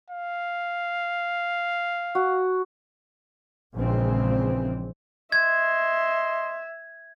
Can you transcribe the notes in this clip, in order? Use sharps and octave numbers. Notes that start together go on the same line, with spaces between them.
F5
F#4
A#1 C#3 E3 G#3 C4
D#5 E5 C6 G#6